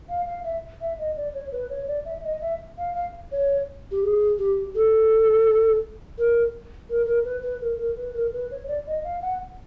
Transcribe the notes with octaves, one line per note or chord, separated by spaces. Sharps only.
F5
F5
E5
E5
D#5
D5
C#5
B4
C#5
D5
E5
D#5
E5
F5
F5
C#5
G4
G#4
G4
A4
A#4
A#4
A#4
B4
B4
A#4
A#4
B4
A#4
B4
C#5
D5
D#5
F5
F#5